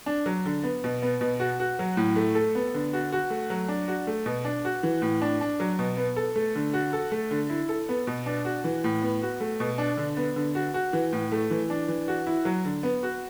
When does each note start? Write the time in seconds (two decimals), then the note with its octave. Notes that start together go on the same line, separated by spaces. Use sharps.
0.06 D4
0.26 F#3
0.45 D3
0.64 B3
0.84 B2
1.02 B3
1.21 B2
1.40 F#4
1.60 F#4
1.79 F#3
1.97 A2
2.16 A3
2.35 A4
2.55 B3
2.74 D3
2.93 F#4
3.12 F#4
3.30 A3
3.50 F#3
3.68 D4
3.88 F#4
4.07 A3
4.26 B2
4.45 D4
4.65 F#4
4.83 E3
5.02 A2
5.22 D4
5.41 D4
5.60 F#3
5.79 B2
5.97 B3
6.16 A4
6.36 A3
6.55 D3
6.73 F#4
6.93 A4
7.12 A3
7.31 D3
7.50 E4
7.69 A4
7.89 B3
8.07 B2
8.26 D4
8.45 F#4
8.64 E3
8.84 A2
9.02 B3
9.22 F#4
9.40 A3
9.60 B2
9.78 D4
9.97 D3
10.17 B3
10.36 D3
10.55 F#4
10.74 F#4
10.93 E3
11.13 A2
11.32 A3
11.51 E3
11.70 D4
11.88 E3
12.08 F#4
12.27 E4
12.45 F#3
12.65 D3
12.83 B3
13.03 F#4